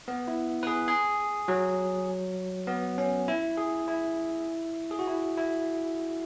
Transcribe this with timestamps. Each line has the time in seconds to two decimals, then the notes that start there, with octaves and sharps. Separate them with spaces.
0.08 B3
0.28 E4
0.63 B4
0.67 G#4
0.88 G#4
1.48 F#3
2.67 B3
2.98 C#4
3.28 E4
3.57 G#4
3.88 E4
4.91 G#4
4.99 F#4
5.07 E4
5.37 E4